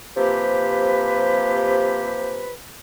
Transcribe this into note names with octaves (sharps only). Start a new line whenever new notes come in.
C3 F3 A#3 G4 B4